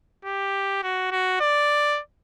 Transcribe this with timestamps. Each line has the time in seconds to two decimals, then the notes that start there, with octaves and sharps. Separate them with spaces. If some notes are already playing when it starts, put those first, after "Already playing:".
0.25 G4
0.83 F#4
1.11 F#4
1.40 D5